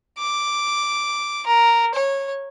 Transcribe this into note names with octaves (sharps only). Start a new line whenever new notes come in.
D6
A#4
C#5